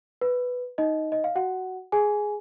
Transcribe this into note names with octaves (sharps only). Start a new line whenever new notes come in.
B4
D#4 D#5
D#5
F5
F#4 F#5
G#4 G#5